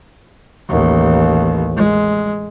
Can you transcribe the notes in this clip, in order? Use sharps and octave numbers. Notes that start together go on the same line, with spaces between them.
A1 D#2
G#3